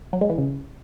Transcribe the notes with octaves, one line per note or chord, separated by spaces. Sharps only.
F#3
G#3
E3
C#3